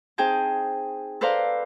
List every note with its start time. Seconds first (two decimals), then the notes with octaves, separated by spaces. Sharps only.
0.18 C4 D#4 G#4 G5 A5
1.21 A4 B4 C5 D5 F5 A#5